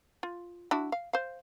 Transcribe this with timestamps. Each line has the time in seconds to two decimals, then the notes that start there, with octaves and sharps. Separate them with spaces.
0.23 F4
0.71 D4 E4 F#4
0.92 F5
1.13 C5 F5